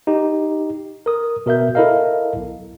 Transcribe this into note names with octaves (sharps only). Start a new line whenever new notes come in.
D#4 G4
A#4 D#6
B2 A#4 E5 G6
E4 A4 A#4 D#5 F5
B1